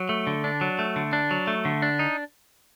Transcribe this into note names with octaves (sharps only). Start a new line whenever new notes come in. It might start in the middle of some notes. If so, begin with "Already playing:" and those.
Already playing: F#3
A3
D3
D4
F#3
A3
D3
D4
F#3
A3
D3
D4
D#4